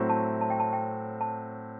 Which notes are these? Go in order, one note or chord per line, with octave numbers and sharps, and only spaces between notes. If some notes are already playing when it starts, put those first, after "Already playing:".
Already playing: A2 F#3 A3 C4 F#4
A5
A5
G5
A5
G5
A5